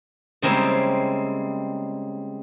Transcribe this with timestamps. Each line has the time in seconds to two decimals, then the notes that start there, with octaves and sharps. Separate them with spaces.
0.42 C#3 G3 G#3 A#3 C4 E4